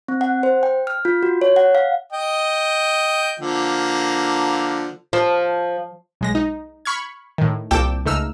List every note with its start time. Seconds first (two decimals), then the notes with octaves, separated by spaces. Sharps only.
0.08 C4
0.21 F#5
0.43 C5
0.63 G5
0.87 F6
1.05 F4
1.23 F#4
1.42 C#5
1.56 F#5
1.75 F5
2.12 D#5 G5
3.40 D3 F3 A#3
5.13 F3
6.21 B1 G#3 A#6
6.35 D#4
6.85 B5 C#6 F6 G#6
7.38 A2 D#3
7.71 C2 A#2 A4 G5 D6 E7
8.06 C#2 A3 D#4 E6 F6